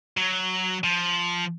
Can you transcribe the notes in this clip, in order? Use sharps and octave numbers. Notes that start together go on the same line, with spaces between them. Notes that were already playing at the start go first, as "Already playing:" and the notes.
F#3
F3